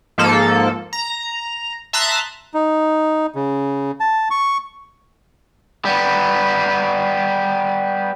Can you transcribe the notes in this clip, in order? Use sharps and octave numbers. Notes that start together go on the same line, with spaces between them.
G#2 F3 A#3 A4
A#5
E5 A5 A#5 C6 D#6 F#6
D#4
C#3
A5
C#6
G3 B3